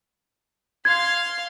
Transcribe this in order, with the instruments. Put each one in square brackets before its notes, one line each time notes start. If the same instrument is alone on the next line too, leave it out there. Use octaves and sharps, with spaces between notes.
[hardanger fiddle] F5 C6 [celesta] G#6